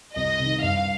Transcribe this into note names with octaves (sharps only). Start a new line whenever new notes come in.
C2 D#5
C3 D#3
G2 F5